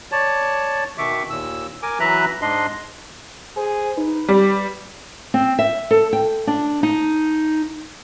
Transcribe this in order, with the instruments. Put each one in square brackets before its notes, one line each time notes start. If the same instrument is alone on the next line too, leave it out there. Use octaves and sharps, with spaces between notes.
[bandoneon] C#5 D5 A5
B2 D#3 E5 C#6 D6
D#2 A#2 E6
A#4 G#5 D6
E3 F#3 B4 E5 A#5 F#6
G#2 D4 D#5 C6
[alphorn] G#4 [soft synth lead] C5
[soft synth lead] D#4 [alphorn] B4
[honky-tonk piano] G3 [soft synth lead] D6
[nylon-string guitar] C4
E5
A4
G5
D4
D#4